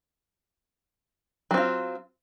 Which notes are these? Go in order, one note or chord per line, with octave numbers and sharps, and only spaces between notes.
F#3 C4 F4